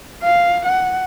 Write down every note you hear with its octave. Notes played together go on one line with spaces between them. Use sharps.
F5
F#5